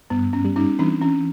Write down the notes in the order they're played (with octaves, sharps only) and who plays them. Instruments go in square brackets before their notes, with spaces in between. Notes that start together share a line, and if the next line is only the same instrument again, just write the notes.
[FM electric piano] G2 [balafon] B3
[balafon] C#4
[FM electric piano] G3
[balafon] C#4 D#4
[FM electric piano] E3 [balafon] C4 D4
[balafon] C#4